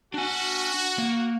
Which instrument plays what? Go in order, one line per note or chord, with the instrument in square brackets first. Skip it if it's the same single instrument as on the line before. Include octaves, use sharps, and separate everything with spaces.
[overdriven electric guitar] D4 G#5 [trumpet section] F#4
[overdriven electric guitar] A#3